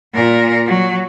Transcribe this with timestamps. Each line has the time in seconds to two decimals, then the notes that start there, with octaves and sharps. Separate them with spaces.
0.13 A#2 A#4
0.66 F#3